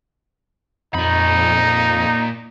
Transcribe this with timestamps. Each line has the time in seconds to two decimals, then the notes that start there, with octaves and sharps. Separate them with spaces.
0.94 F2 A#2 D#4 B5